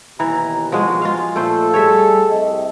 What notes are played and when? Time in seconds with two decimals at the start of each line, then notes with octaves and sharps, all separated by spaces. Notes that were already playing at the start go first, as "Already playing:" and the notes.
0.20 D#2 B2 E3 A#5
0.72 F3 G#3 F#4
1.02 G#3 F4 F5
1.36 A#2 A3 F4 A4 C5
1.74 G3 G#4 C#5 E5
2.30 C2 C3 D#5